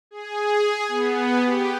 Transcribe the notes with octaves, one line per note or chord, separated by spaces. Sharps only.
G#4
B3
G4